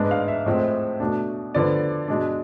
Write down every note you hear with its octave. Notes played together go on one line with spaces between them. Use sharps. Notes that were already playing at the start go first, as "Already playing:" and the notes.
Already playing: G#2 G#3 B3 D4
F5
E5
A2 F3 G#3 C4
B2 A3 D4
D3 F3 B3 D5
B2 G#3 D4